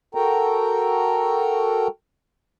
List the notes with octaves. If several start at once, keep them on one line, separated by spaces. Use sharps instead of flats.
F#4 A4 A#4 G5 A#5